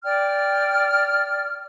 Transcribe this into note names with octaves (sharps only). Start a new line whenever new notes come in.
D5 G5 F6